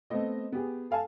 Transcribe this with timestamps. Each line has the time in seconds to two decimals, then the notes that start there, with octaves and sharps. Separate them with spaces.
0.10 A3 B3 C4 D#5
0.52 B3 G4 G#4
0.91 A4 F5 G#5 A5